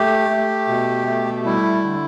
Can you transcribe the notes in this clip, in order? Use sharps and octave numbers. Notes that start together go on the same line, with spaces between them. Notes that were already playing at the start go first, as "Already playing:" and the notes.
Already playing: A3 G4
A3
B2
A3
G3 E4
D3